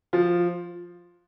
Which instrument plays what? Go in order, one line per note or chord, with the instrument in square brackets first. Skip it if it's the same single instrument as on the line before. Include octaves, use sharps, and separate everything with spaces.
[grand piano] F3